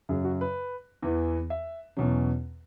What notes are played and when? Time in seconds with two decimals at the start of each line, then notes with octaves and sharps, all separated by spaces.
0.09 F#2 C#3 F#3 G#4
0.24 F#4
0.41 B4
1.02 E2 E3 B3
1.50 E5
1.97 E2 B2 F#3 C#4